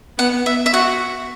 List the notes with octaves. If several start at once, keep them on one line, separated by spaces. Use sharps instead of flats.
B3 F#5
E5
E5
F#4 F#5